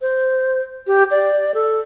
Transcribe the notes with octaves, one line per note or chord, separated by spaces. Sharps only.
C5
G4
D5
A4